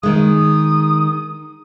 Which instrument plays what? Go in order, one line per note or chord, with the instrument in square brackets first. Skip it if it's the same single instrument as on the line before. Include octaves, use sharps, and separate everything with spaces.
[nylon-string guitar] D#3 G#3 [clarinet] D#6